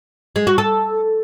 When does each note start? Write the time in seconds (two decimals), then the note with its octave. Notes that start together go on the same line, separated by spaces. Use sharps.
0.36 G#3
0.47 F#4
0.58 A4